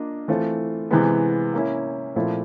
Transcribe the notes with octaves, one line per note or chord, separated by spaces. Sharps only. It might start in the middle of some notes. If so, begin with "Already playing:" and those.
Already playing: A#3 D4 F4 A#4 D#5
E3 A3 C4 F4
C3 E3 G#3 B3
A#3 C#4 E4
A#2 F3 A3 C4 E4